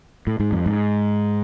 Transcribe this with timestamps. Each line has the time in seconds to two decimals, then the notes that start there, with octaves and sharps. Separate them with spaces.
0.27 A2
0.40 G#2
0.52 F2
0.66 G#2